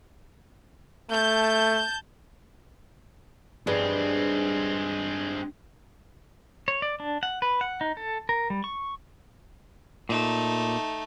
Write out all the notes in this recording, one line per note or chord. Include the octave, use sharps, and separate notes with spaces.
A3 A5 G6
G2 G#3 C4 G#4 B4 D5
C#5
D5
D4
F#5
B4
F#5
D#4
A4
A#4
G3
C#6
A#2 A3 D#4